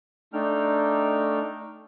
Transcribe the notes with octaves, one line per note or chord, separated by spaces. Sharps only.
A3 D4 D#4 G5 F6